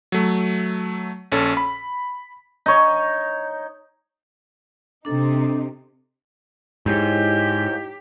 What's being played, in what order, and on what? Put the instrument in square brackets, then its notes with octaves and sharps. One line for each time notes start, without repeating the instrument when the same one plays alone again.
[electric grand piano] F#3 A3
A#1 C#4 A4
B5
[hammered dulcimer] D#4 C#5
[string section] C3 D#4 [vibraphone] D4 A4
[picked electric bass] G#2 [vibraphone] E4 C#5 D#5 [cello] G4 [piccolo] G6